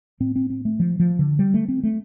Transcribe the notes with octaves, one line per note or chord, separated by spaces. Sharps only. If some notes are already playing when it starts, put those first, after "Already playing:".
A2 C4
C4
C4
A3
F3
F3
D3
G3
A3
C4
A3